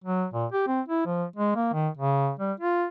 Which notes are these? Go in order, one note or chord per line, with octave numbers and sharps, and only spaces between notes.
F#3
A#2
G4
C4
E4
F3
G#3
A#3
D#3
C#3
G3
F4